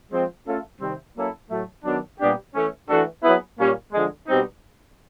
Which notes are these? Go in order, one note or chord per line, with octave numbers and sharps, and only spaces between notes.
F3 G#3 C4
A3 C#4 F4 A4
C3 D#3 G3 C4
F#3 A#3 C#4 E4 A4
A2 F#3 A3
D#3 F#3 B3 D4
A#2 G3 B3 D4 G4
E3 A3 C#4
E3 A3 D4 F#4 A4
F#3 B3 E4 G#4 B4
A#2 G3 A#3 C#4
D3 F3 G#3
B2 G3 C4 D#4